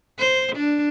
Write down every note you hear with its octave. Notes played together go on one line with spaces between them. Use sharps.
C5
D4